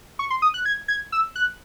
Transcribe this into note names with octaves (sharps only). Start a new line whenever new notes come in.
C#6
C6
D#6
F#6
G#6
G#6
E6
F#6